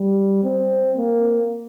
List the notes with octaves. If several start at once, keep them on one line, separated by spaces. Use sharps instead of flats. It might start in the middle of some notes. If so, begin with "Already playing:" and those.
Already playing: G3
C4
A#3